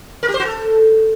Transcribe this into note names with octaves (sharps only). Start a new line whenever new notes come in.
A#4
G4
C5
F#4
A4